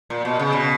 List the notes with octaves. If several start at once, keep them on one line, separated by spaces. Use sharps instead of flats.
A#2
B2
C#3
B2